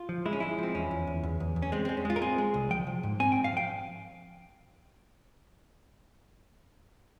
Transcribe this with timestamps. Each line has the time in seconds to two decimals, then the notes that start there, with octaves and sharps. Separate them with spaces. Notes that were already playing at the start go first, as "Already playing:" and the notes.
Already playing: F4
0.09 F3
0.26 G#3 E4
0.33 C#4
0.40 G#3 E4
0.58 F3 C4
0.75 E2 C#4
0.91 E2
1.07 E2
1.23 E2
1.40 E2
1.56 E2
1.62 C#4
1.72 G#3 C4
1.85 G#3 C4
1.97 C#4
2.05 G#3 F4
2.16 A#4
2.22 C4 G#4
2.38 G#3
2.54 C2
2.71 F3 G5
2.87 F3
3.03 G#2
3.20 C4 G#5
3.32 G#2 G5
3.44 F5
3.53 F3 G5